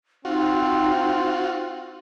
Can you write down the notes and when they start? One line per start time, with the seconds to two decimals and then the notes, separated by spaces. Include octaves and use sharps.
0.25 C4 D#4 F4 F#4